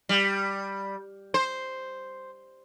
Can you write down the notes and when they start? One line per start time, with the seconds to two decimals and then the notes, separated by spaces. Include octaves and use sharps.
0.09 G3
1.34 C5